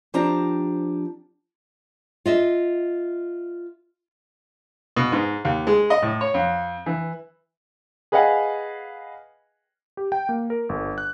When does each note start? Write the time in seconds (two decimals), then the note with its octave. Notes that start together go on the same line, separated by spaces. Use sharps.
0.14 F3 C4 D4 G4 A#5
2.26 F4 D#5 E5
4.96 B2
5.12 G#2
5.45 D#2
5.67 G#3
5.90 D#5
6.03 A2
6.21 C#5
6.34 F2
6.86 E3
8.12 G#4 B4 D#5 F5 F#5 G#5
9.97 G4
10.12 G5
10.29 A#3
10.50 A#4
10.69 G1
10.98 F#6